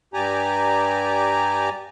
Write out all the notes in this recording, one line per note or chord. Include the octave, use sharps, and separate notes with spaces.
G2 G4 D5 G#5 A#5